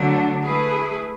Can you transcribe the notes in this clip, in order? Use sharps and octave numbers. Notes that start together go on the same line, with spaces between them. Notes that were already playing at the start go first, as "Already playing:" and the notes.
Already playing: D3 F#3 A3 D4
A3 E4 G#4 B4